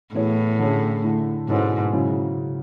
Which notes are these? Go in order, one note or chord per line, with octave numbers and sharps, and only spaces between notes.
A2 E3 B3 E4 G#4 C#5
D3 A3 C#4 G#4
D3 A3 E4
G#2 B2 G#3 C#4 E4 A4
C#3 F#3 C#4 E4